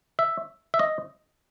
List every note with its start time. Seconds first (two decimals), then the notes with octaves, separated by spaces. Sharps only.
0.19 E5
0.74 E5
0.79 D#5